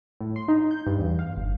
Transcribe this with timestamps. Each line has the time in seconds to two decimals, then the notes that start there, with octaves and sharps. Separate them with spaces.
0.21 A2
0.36 C6
0.48 D#4
0.71 G6
0.87 G2
0.98 E2
1.19 F5
1.36 G1